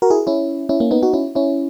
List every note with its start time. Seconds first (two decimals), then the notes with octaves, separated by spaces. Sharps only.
0.02 F#4 A#4
0.10 E4 G#4
0.27 C#4 E4
0.69 C#4 E4
0.80 A#3 C#4
0.91 B3 D#4
1.03 D#4 F#4
1.14 C#4 E4
1.35 C#4 E4